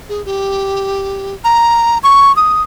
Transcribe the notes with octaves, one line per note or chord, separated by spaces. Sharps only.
G#4
G4
A#5
C#6
D#6